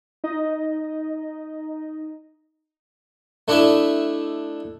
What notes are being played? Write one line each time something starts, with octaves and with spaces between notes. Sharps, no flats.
D#4 D#5
A3 D4 E4 D#5 E5